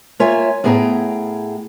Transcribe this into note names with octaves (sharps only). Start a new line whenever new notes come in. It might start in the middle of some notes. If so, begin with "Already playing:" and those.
A#3 F4 C#5 E5 G#5
A2 B3 G#4 G5 A5 A#5